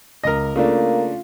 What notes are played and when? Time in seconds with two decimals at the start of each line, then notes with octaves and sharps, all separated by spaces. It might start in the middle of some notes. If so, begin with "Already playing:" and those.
0.24 C#2 A#4 D#5 A#6
0.56 C#3 A3 A#3 D4 F4